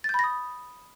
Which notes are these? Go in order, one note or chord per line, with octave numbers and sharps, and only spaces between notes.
B5 D#6 G6 A6 A#6